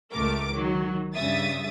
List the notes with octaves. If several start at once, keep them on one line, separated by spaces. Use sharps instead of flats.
C#2 A3 A#4 D6
D#3 F#3
G2 C#3 E5 D#6 A6